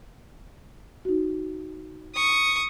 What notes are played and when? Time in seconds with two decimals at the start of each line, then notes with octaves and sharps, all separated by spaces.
1.05 D#4 F#4
2.15 C#6 D#6